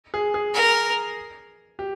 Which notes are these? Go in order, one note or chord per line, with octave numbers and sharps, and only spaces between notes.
G#4
G#4
A#4
G4